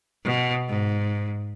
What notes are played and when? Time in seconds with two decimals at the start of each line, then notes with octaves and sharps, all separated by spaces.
0.24 B2
0.68 G#2